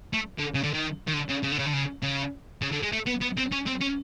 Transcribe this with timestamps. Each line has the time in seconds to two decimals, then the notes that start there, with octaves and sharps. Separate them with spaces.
0.14 A3
0.39 D3
0.54 C#3
0.63 D3
0.74 D#3
1.07 D#3
1.13 D3
1.29 C#3
1.43 C#3
1.51 D3
1.59 C#3
1.66 D3
1.73 C#3
2.03 C#3
2.62 C#3
2.72 D3
2.83 G#3
2.93 A3
3.07 B3
3.22 B3
3.38 C4
3.53 C#4
3.67 C4
3.81 C#4